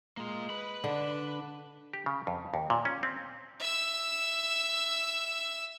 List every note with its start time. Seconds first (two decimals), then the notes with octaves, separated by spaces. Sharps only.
0.17 G#3 A#3 F4
0.50 B4 B5
0.84 D3 D4
1.93 G4
2.06 C#3
2.27 F2
2.54 D#2
2.70 A#2
2.85 C#4
3.03 C4
3.59 E5 E6